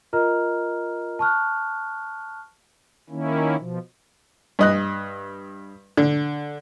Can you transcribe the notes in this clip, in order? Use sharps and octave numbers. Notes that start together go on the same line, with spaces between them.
F4 A#4 D#5 A#5 F6
A5 C#6 F6 F#6
D#3 A#3 C#4 E4
B2 F3
G2 D#5 F#6
D3